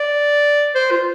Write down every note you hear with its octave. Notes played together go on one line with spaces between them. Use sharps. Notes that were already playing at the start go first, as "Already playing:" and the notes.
Already playing: D5
C5
F4